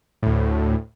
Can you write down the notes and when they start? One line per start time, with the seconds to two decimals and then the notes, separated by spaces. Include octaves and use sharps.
0.23 D2 A2